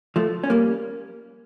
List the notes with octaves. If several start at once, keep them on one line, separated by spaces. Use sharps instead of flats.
F3 A3
C#4
G3 A#3